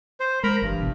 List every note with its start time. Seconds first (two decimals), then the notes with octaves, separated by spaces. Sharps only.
0.20 C5
0.43 G#3 A#4 A#5 B5
0.62 G1 G2 E3
0.79 G1 B2